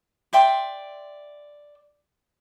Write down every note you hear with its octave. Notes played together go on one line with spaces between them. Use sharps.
D5 E5 G5 C6